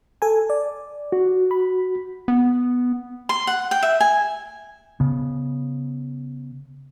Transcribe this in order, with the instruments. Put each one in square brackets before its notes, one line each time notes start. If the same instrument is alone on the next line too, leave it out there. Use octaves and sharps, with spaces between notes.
[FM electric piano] A4 G#5
D5
[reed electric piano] F#4
[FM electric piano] B5
[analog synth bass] B3
[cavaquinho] C6
F#5
G5
E5
G#5
[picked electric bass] C#3 B3